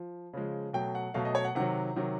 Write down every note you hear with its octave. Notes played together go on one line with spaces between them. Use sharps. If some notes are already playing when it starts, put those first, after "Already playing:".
Already playing: F3
C#3 F3 G#3
B2 F#3 A3 G5
F#5
B2 F#3 A3 F5
D#5
C#5
F#5
C3 D#3 F#3 F#5
C3 D#3 F#3